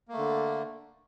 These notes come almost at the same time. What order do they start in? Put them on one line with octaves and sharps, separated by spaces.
A#3 A3 D3